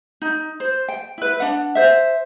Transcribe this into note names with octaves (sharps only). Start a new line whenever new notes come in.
D#4
C5
G5
E4 B4
D4 F#5
C5 E5